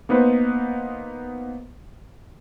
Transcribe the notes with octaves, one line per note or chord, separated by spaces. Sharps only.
A#3 B3 D#4 B4 C5